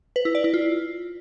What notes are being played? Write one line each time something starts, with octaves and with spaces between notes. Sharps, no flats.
B4
E4
D5
E4
F4